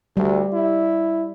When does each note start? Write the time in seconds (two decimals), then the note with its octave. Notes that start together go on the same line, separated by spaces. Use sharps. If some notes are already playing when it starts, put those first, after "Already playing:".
0.17 D2 G3
0.53 E4